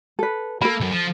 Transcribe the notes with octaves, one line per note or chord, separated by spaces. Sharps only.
A4 B4
A#3 A4 B5
C#2 F#2
F3